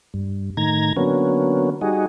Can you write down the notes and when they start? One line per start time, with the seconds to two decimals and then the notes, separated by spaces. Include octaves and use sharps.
0.14 G2
0.57 A2 D#3 A#5 G#6
0.97 D3 F#3 A#3 B3 C#4
1.81 G3 D#4 F#4 G#4